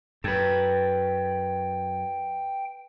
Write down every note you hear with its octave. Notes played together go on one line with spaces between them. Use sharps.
F#2 A4 B4 G5